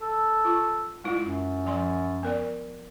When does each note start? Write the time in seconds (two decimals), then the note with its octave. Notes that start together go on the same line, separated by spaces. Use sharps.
0.02 A4
0.45 F4 C#6
1.04 G#3 E4 F4
1.20 F#2
1.66 F3 G#5 C6
2.23 B3 A#4 D5